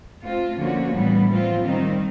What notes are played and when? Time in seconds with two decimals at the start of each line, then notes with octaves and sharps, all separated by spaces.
0.23 A3 C4 F4
0.59 D3 F3 A#3 C#4 F#4
0.93 A2 E3 G3 B3
1.28 F3 A3 C4 F4
1.64 D#3 G3 C4 D#4